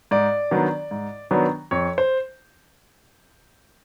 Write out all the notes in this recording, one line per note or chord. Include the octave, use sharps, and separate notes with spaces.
G#2 D5
D#3 F#3 B3 D4
G#2
D#3 F#3 B3 D4
F2 C#5
C5